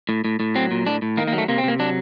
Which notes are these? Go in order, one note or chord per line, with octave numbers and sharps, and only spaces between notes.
A2
A2
A2
F#3 C4
A#2
A2 D4
A2
D#3 A#3
A#3
F#3
A3
C3 A#3
C4
C3 A#3
F#3 D4